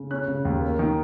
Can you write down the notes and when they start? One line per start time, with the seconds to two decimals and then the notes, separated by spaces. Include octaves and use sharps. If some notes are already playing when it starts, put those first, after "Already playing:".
Already playing: C#3
0.11 C#4 F#6
0.28 C#3
0.45 D#2
0.62 A#3
0.79 D#3